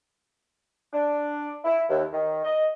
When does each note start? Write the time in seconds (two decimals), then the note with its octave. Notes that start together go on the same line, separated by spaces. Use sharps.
0.93 D4
1.65 E4
1.89 D#2
2.13 D#3
2.45 D#5